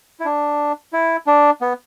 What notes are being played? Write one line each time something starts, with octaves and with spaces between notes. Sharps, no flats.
E4
D4
E4
D4
B3